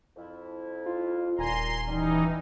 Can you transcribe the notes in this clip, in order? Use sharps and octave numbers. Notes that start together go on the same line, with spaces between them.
F2 E4
F4
D#1 A#2 G#5 A#5 C6
E3 G3 C#4 D#4